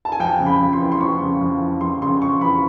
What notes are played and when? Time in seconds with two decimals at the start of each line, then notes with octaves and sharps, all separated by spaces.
0.05 A5
0.12 G#5
0.20 F2 G5
0.40 C#3
0.46 B5
0.60 F2
0.73 C6
0.80 E3
0.92 C6
1.01 F2 C#6
1.21 C#3
1.41 F2
1.61 E3
1.81 F2 C6
2.02 C#3 C6
2.22 F2 C#6
2.41 E3 B5